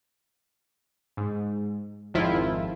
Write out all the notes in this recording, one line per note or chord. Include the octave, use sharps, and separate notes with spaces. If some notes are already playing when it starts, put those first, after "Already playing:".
G#2
G#1 F2 D#3 F3 E4 F4